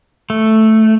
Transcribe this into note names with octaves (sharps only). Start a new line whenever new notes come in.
A3